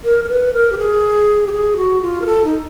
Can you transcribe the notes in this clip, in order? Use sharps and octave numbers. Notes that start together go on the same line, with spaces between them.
A#4
A#4
B4
A#4
G4
G#4
G4
G#4
F#4
F4
A#4
A4
D#4